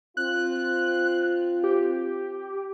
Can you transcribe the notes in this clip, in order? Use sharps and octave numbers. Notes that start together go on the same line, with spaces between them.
C4 F4 F#6
G4